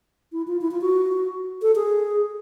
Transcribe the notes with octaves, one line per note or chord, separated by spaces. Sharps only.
E4
F4
E4
F4
F#4
A4
G#4